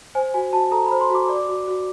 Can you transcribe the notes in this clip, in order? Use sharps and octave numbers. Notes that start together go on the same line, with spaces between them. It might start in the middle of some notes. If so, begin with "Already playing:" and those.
C5 G#5
F#4 G#5
F#4 A5
A4 A#5
B5
C5
C6
F#4 D6
D5 D6
F#4
F#4